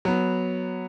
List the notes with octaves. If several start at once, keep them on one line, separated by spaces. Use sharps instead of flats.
F#3 B3